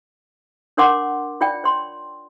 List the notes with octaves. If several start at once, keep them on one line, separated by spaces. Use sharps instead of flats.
D4 A#4 C#5 F#5 C6 D6
F4 C#5 D5 G5
C#5 C6